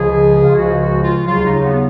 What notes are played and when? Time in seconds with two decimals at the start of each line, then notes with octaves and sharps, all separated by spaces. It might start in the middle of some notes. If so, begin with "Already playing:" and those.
Already playing: C#2 C#3 F3 G#4
0.44 F4
0.55 C#2 C#3 F3 F#4
0.79 F#4
1.04 F4
1.26 D#2 C#3 F#3 F4
1.45 D#4
1.63 B3